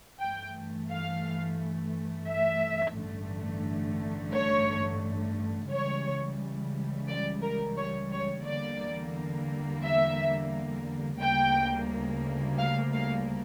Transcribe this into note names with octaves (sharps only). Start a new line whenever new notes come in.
G2 E3 A3 G5
F5
E5
A1 G2 D3 A3
C#5
C#2 C#3 E3 G3 C#5
D5
A#4
C#5
C#5
E2 D3 G3 A#3 D5
E5
D2 C#3 G3 A#3 G5
F5
F5